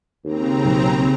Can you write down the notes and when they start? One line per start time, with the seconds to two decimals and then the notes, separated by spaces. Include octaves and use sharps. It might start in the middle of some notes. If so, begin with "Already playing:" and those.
0.25 D#2 C#3 C4 A#5
0.65 B1